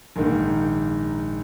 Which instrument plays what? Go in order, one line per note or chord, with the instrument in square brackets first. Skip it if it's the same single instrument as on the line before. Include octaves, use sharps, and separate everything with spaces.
[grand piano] A#1 G#2 D#3 A#3 D#4